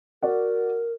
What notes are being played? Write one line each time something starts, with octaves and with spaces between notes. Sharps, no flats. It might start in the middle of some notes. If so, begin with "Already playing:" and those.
F#4 A#4 D5 F#5